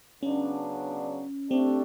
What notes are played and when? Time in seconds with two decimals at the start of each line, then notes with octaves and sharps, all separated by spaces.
0.23 C#3 F#3 B3 C#4 D4
1.51 A3 C4 D4 G4